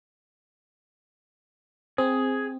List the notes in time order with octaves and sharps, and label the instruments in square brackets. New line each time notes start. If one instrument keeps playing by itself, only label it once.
[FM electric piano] C4 [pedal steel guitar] G#4